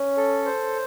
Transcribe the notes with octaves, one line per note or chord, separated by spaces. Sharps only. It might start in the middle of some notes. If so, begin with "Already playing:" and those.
Already playing: C#4 C#5
A4
C5